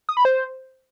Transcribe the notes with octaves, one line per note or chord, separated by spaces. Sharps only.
D#6
B5
C5